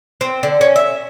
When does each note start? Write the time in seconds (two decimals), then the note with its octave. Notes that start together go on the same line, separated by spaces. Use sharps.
0.21 C4
0.43 D3
0.61 C#4
0.76 E5